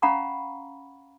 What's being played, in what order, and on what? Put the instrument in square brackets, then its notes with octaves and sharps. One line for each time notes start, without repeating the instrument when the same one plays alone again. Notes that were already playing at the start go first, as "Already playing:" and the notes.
[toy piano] C#4 F5 F#5 A#5 B5 C#6